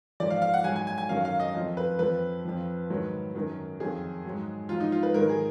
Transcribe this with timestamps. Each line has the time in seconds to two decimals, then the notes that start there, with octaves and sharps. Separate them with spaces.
0.20 G#2 F3 D5
0.30 F5
0.42 F5
0.54 F#5
0.64 G#2 F#3 G#5
0.76 G#5
0.87 G#5
0.98 G#5
1.09 F#2 D#3 F#3 F5
1.25 F5
1.40 D#5
1.55 F2 F3
1.77 B4
1.99 F2 F3 B4
2.45 F2 F3
2.90 G#2 D#3 F#3
3.35 F#2 D#3 F#3
3.80 F2 D#3 F#3 G#4
4.25 G#2 F#3
4.69 G#2 F3 F4
4.80 D#4
4.92 F4
5.03 B4
5.14 G#2 D#3 F#3 A#4
5.29 G#4